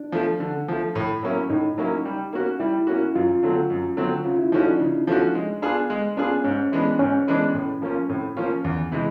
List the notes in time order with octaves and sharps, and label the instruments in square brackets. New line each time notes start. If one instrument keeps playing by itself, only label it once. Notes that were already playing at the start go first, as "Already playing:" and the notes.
Already playing: [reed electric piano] D4
[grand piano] F3 A3
D3
F3 A3
A2
F#3 A#3 C#4 E4
[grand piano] A2 [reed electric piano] D#4
[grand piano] F#3 A#3 C#4 E4
G3
A#3 C#4 F#4
[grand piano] G3 [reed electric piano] E4
[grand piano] A#3 C#4 F#4
[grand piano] F#2 [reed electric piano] F4
[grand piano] D3 F#3 A3 C4
F#2
D3 F#3 A3 C4
[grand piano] C#3 [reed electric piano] F4
[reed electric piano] E4
[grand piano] F3 A3 C#4 F#4 [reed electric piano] D#4
[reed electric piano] D4
[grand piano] C#3
F3 A3 C#4 F#4
G#3
B3 D4 F4 G#4
G#3
[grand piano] B3 D4 F4 G#4 [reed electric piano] C#4
[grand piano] G#2 [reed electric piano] C#4
[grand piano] E3 G#3 B3 D4
[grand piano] G#2 [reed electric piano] C#4
[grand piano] E3 G#3 B3 D4
A2
F3 A#3 C#4 F4
[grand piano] A2 [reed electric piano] C4
[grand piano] F3 A#3 C#4 F4
E2
C3 E3 G#3